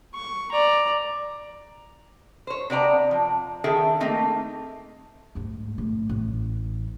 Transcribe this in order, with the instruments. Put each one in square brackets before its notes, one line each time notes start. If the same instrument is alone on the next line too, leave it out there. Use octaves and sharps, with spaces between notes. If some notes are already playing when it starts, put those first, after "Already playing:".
[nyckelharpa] C#6
D5 A#5
[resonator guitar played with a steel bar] C5 C#5
C3 B3 D5 A#5
F3
D#3 G#4 A4 E5 G5
A3 A#3 C4 D#4
[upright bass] D2 G#2
A2
A1